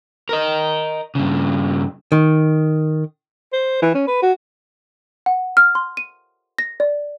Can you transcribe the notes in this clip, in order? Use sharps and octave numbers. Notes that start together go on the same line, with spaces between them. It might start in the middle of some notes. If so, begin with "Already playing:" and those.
A#4 D#5
G2 C#3
D#3
C5
E3
C#4
B4
F#4
F#5
F6
C6
D#7
A#6
D5